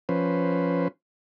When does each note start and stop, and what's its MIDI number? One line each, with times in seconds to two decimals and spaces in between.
0.09 0.88 53
0.09 0.88 61
0.09 0.88 71
0.09 0.88 72